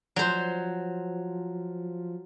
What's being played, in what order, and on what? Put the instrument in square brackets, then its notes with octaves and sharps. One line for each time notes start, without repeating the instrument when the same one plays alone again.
[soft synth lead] F3 [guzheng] F#3 C5